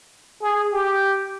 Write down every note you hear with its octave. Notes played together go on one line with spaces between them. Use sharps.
G#4
G4